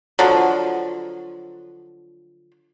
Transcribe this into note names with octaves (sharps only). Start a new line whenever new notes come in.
D3 F3 F#3